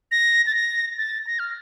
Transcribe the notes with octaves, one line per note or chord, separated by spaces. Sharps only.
A#6
A6
A#6
A6
A#6
F6